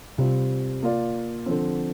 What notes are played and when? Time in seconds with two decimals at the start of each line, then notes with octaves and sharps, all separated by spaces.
0.18 C3 G3 C4 F4
0.83 A#3 F4 D5
1.46 D3 F3 C4